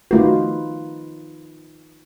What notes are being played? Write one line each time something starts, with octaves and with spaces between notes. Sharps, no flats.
A3 D#4 F4 F#4 B4